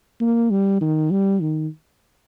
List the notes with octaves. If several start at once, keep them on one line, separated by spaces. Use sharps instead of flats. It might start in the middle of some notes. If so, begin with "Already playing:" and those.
A#3
G3
D#3
G3
D#3